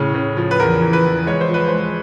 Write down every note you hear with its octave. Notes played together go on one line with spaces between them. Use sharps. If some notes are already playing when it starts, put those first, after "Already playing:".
Already playing: A2 C#3
C#3
F3
B4
E2 A#4
E3
B4
E2
G#3 C#5
C5
F3 B4
G#3 C5